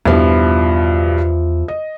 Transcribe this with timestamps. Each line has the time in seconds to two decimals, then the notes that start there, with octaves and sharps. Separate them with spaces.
0.06 E2 G2 B2 F3 E4
1.68 D#5